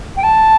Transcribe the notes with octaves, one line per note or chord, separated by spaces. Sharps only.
G5
A5